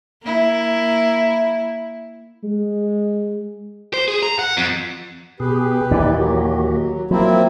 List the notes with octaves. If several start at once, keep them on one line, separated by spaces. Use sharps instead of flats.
A#3 E4
G#3
C5
G#4
A#5
F#5
F2
B2 G4 G#4 B4
D#2 A#2 E3 D#4 E4 D5
F#3 A#3 F#4 G4
F3 F#3 A#3 C4 E4